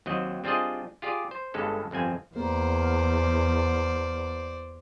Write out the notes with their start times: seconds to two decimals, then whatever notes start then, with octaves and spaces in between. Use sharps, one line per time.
0.06 D#2 F#3 C4 D#5
0.44 G3 C4 D4 F4 G#4 D#5
1.02 F4 G4 G#4 D5
1.31 C5
1.54 G1 G2 G#3 C#4 A4
1.91 G1 F2 C4 G#5
2.36 E2 A#3 C5 D5